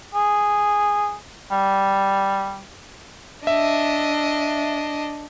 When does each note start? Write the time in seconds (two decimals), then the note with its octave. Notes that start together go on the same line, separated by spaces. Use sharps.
0.14 G#4
1.51 G3
3.47 D4 D#5 E5